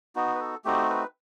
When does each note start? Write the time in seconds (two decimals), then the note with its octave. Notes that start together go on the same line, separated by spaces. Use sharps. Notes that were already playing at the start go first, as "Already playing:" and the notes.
0.16 B3 D#4 F#4
0.35 B4
0.40 A4
0.65 A3 C4 D#4 F#4 G4
0.90 B4